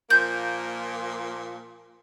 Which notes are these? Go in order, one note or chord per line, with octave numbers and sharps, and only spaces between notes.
A#2 F3 A#3 G6